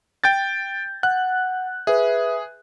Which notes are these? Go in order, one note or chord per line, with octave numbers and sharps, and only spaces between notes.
G5 G6 A6
F#5 F#6
G#4 B4 E5